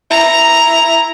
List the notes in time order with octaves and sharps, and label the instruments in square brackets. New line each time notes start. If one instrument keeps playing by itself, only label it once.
[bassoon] E4 [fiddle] A#5